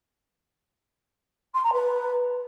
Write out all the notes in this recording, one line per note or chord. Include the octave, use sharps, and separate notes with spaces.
C6
A#5
B4